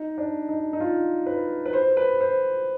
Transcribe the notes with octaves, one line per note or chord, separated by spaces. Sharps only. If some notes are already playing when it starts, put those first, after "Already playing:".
Already playing: D#4
D4
D#4
D#4
F4
B4
B4
C5
B4
C5